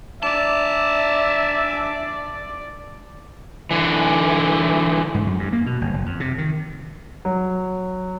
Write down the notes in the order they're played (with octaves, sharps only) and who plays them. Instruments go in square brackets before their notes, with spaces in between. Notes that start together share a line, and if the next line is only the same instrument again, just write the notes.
[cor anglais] D4 [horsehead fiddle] D5 [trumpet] E5 [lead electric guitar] G#5 A5
[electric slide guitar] D3 E3
[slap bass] G#2
F#2
G2
A#3
B2
G1
F#1
F2
C3
D#3
[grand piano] F#3